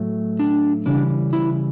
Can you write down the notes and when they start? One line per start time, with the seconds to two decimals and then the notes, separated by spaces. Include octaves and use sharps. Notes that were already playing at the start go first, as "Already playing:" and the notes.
Already playing: A2 F#3 A3
0.39 D4
0.86 C#3 E3 G3 D4
1.33 E4